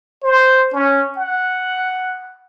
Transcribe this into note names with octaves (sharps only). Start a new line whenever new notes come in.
C5
C#4
F#5